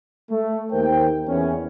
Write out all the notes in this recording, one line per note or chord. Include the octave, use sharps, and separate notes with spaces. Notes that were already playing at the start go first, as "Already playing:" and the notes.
A3
D#2 A#4 C5 G5
E2 C#4